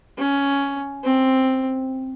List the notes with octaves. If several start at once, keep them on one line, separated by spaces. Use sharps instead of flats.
C#4
C4